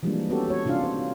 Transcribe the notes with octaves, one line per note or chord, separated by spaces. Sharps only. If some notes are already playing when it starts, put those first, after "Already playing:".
E3 F3 G3 G#3 A#3 D4
B3 C#4 F#4 G4 A4
F#4 C#5
C3 C#4 D4 F4 F5
C5